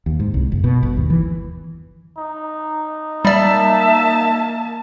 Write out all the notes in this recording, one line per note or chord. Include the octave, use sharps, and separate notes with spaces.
D#2
G#2
C2
F#1
B2
G1
D#2
E3
D#4
G3 A#3 D5 E5 A5